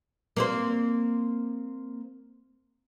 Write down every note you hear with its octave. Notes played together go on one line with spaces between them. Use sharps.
A#3 C4 C5